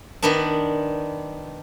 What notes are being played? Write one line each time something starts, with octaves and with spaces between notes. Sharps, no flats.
D#3 B3 D4